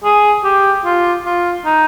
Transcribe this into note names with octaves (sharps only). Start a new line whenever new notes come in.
G#4
G4
F4
F4
D#4